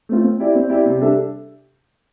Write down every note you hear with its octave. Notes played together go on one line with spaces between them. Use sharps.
A3 C4 F4
C4
E4 G4 D5
C4
E4 G4 D5
C3
G3 D4 A4 E5